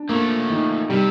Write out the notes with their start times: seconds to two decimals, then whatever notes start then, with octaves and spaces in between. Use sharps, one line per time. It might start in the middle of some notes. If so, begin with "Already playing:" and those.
Already playing: D4
0.09 F3 A3 A#3
0.50 D#3
0.89 C3 G3